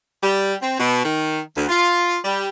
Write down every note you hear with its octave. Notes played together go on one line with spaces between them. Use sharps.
G3
C4
B2
D#3
D2
F4
G3